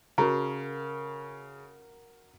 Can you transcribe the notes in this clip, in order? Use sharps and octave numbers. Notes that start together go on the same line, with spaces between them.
C#3 F#4 A#4 A#5